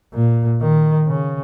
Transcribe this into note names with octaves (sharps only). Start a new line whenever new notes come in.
A#2
D#3
C#3